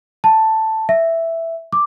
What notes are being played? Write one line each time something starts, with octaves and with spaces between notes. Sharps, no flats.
A5
E5
D6